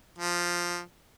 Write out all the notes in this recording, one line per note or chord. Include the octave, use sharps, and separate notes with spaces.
F3